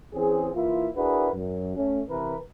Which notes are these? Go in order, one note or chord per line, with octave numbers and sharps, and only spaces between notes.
E3 C4 C#4 G#4
E3 A#3 E4 F4
D4 E4 F#4 G#4 A#4 B4
F#2
A3 C#4
C3 E3 A#4 B4